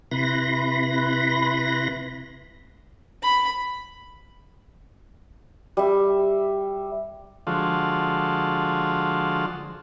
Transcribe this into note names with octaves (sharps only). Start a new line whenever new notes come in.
C3 E4 B4 B5 C6 A#6
B5
G3 E5
D3 F3 G#3 F4 F#4 A4